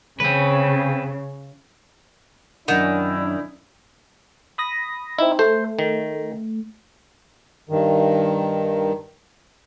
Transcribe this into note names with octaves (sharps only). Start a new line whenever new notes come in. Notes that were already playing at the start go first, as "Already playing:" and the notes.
C#3 C4 B4
F#2 D#3 C#4 D4 E4 F#5
B5 D#6 A#6
C4 D#4 E4
A3 C5
D#3
G2 D#3